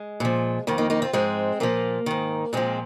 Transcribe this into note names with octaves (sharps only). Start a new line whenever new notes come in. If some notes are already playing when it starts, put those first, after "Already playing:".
Already playing: G#3
A#2 F3
F2 D#3 A#3
A#3 D#4
A#3 D#4
C4 F4
G#2 F3 G#3 C4
A#2 F3 A#3
G#2 D#3
A#2 F3 G#3 C4